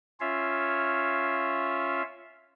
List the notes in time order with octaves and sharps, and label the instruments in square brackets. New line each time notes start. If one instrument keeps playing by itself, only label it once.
[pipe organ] C#4 F4 C#5 E5 F5